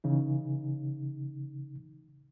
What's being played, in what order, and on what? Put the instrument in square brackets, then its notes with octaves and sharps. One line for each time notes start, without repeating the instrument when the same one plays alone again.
[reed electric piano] C#3 E3 D#4